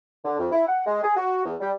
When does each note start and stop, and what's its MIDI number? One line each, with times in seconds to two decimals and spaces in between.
0.25 0.37 50
0.38 0.48 41
0.52 0.63 64
0.67 0.85 78
0.86 1.01 56
1.02 1.16 68
1.17 1.42 66
1.45 1.55 40
1.60 1.71 55